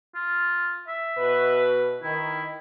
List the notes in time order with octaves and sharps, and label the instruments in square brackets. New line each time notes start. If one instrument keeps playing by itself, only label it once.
[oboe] F4
E5
[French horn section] B2 B4
[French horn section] D#3 [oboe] E4